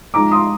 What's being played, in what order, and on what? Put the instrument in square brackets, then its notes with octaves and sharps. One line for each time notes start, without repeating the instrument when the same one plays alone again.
[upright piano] F3 G#3 D#4 A#5 D6
C6 D#6